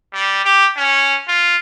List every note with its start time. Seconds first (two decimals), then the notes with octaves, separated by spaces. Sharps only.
0.13 G3
0.45 G4
0.77 C#4
1.28 F4